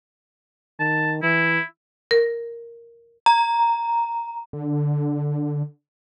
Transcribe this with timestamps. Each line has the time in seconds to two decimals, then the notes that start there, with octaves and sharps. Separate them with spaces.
0.79 D#3 A5
1.23 E3 E4
2.11 A#4
3.26 A#5
4.53 D3